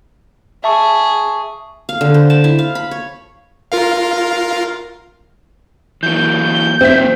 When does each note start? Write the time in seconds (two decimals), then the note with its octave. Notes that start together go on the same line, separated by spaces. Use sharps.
0.64 G#4 E5 A5 C#6
1.89 F5
2.01 D3
2.14 C5
2.30 A5
2.44 E4
2.59 F5
2.75 B5
2.91 C#5
3.72 F4 A#4 F5
6.03 E3 F#3 A#3 G6
6.81 F2 C4 E5 B6
6.93 F#2 A#2 D#3